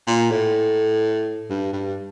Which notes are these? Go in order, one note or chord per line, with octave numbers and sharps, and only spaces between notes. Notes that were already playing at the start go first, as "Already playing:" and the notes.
A#2
A2
G2
G2